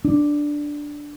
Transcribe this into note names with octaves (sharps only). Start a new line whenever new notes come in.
D4